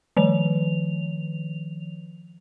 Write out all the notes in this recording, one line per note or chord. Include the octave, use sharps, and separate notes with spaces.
D#3 F3 F7